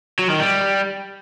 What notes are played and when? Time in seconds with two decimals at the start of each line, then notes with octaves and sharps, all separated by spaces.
0.19 F#3
0.30 D#3
0.40 G3